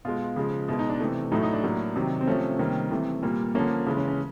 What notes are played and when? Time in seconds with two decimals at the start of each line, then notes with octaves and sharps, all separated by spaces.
0.05 B2 G#3 F4
0.36 C#3 F3 G#3
0.68 B2 G#3 E4
0.79 D#4
0.89 D4
1.00 C3 E3 A3
1.32 A2 F#3 A3 D#4
1.43 D#4
1.53 D4
1.63 A2 F#3 A#3
1.96 C3 D#3 F#3
2.21 C4
2.27 C3 F3 A3 C#4
2.59 C3 D#3 G3 A#3
2.91 C3 E3 A3
3.23 A#2 G3 A#3
3.55 D3 F3 A#3 C#4
3.86 C#3 E3 G#3 C#4
3.97 C#4
4.08 C#4